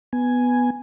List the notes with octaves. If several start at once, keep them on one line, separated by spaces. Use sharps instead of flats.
B3 G#5